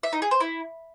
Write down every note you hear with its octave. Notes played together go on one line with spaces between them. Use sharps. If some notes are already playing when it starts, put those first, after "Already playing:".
E5
D#4
G#4
C5
E4